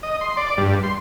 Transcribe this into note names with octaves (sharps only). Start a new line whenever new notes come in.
D#5
C6
D5
G2
C6